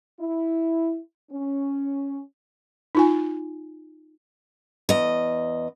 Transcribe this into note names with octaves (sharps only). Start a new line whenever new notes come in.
E4
C#4
D#4 F4 G#5
E2 D#5